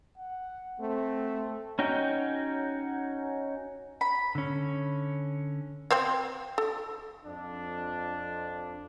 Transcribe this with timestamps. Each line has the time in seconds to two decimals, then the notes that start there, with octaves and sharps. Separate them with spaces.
0.18 F#5
0.80 A3 C4
1.79 C#4 D#4 F#4 G5
4.01 B5
4.35 D3 C#4
5.91 C4 C5 F5
6.58 A4
7.25 F2 D4